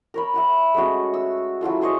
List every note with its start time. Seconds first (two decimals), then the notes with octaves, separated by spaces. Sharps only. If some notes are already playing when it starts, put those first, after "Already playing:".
0.14 A#4 C#5 B5
0.34 E5 F#5 B5
0.74 G#3 A3 C#4 F#4
1.14 E6
1.61 F#3 E4 F4 A4
1.81 G#4 C5 C#5 D#5